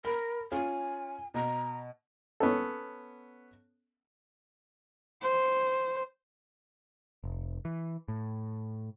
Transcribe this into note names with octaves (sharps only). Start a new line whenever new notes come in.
A#4 B5
C#4 F4 G#5
B2 A#5
B3 C#4 A4
C5
F1
E3
A2